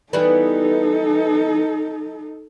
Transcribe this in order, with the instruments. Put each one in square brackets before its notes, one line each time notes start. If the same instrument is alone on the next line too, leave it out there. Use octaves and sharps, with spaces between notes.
[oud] E3 G3 B3 [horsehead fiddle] D#4 A4